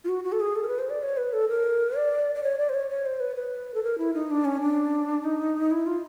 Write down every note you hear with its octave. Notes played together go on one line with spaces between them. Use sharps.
F4
F#4
F#4
A4
G#4
A4
A#4
B4
C5
D5
C#5
B4
A4
A#4
D5
D5
C#5
D5
C5
C#5
C#5
C5
B4
B4
A4
A#4
E4
D#4
D4
C#4
D4
D#4
E4
F4